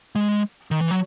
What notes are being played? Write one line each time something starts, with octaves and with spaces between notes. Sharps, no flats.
G#3
D#3
E3
F#3